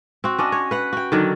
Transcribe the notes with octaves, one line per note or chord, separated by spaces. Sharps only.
C4 F#4
C#4 D4 D#5
C#5
B4 F#5
F#4 G5
D3 D#3 F#3